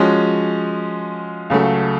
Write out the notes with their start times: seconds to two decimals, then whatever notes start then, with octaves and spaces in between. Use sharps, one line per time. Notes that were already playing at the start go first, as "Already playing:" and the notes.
Already playing: F3 G#3 C#4 F#4
1.50 C#2 C#3 F#3 A3